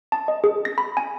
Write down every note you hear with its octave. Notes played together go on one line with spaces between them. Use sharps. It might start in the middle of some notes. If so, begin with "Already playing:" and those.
A5
D#5
G#4
A#6
B5
G#5